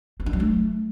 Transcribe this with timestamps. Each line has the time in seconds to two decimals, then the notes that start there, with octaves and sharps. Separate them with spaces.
0.20 C4
0.26 D4
0.33 F#3
0.40 A3